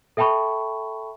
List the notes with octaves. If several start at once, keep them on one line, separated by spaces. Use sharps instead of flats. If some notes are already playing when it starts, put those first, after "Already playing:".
A4 E5 G5 A5 B5 C#6